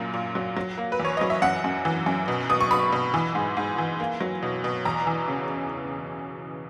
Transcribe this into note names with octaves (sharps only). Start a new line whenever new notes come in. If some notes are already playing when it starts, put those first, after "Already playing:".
Already playing: F#2 A#2 A#3
A#2
F#3
F#3
A#3
B4
E2 C#5
F#3 D#5
E5
F#2 F#5
F#2
E3
F#2
B2
B2 D#6
C#6
B2 B5
B2
E3
G#2
G#2
E3
A#3
F#3
B2
B2
E2 A#5
E3
C#3